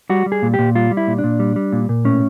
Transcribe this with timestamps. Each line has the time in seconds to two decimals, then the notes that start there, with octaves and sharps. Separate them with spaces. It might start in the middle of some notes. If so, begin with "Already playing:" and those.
0.10 G3 F#4
0.26 G3
0.32 G#4
0.42 A#2
0.54 G4
0.59 A#2
0.75 G3 F4
0.91 G3
0.97 E4
1.07 A#2
1.18 D4
1.24 A#2
1.40 G3
1.56 G3
1.73 A#2
1.89 A#2
2.05 A2 C#4